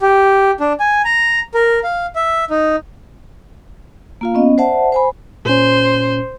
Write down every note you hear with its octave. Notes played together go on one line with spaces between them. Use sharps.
G4
D4
G#5
A#5
A#4
F5
E5
D#4
A#3 F4 F5
B3 C#4 D#5
C5 D5 E5 F#5 A5
C5 G#5 B5
A#2 C#4 C5